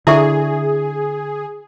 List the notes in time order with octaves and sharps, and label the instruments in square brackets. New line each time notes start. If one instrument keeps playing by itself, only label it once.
[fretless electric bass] D3 [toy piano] E4 E5 C#6 [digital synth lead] G#4